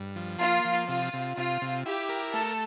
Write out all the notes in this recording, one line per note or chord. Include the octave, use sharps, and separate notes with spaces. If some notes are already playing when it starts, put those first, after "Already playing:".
Already playing: G2
F3
A#3 F4
F3
C3 F4
C3
C3 F4
C3
E4 G4
A#4
A3 A4